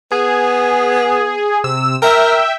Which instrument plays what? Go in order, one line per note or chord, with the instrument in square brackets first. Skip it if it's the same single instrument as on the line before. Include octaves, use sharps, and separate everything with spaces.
[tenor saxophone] B3 [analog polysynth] G#4
[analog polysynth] C3 E6
[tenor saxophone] A#4 [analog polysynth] E5 G5